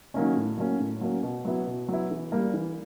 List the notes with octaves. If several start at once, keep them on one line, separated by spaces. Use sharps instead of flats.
D#3 F#3 A#3 C#4
A2
F#3 A#3 C#4
A2
F#3 A#3 C#4
B2
F#3 B3 E4
B2
F#3 B3 E4
E3
G3 A#3
E3